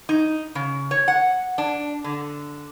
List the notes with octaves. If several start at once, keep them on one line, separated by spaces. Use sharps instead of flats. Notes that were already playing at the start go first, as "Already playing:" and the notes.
D#4
C#3
C#5
F#5
D4
D3